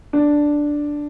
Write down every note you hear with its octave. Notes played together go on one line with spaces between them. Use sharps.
D4